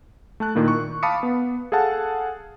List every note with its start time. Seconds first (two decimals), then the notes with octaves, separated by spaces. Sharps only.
0.40 A3 A5 F#6
0.55 A#2 D#3 A#3 E4
0.68 C#6
1.03 F5 A5 B5 D6 D#6 C#7
1.23 B3
1.72 G#4 A4 F5 F#5 A5